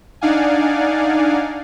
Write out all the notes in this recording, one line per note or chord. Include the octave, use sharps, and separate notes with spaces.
D4 D#4 D5 F5 F#5 G#5